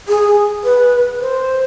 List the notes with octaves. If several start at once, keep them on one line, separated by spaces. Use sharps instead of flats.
G#4
B4
C5